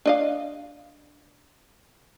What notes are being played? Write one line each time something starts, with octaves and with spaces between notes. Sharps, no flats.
D4 D#5 F5